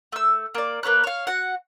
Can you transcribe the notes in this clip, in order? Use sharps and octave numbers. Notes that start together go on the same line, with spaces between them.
A3 E6
A#3 D5
A#3 B4 C#5 F#6
C#5 F5
F#4 F#5